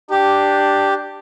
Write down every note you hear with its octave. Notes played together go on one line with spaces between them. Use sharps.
D4 G4